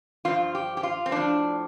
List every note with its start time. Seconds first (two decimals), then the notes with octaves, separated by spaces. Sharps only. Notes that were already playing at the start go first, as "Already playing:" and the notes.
0.25 G2 F3 F4
0.55 G4
0.77 G4
0.83 F4
1.06 C4
1.11 A2 F3 D4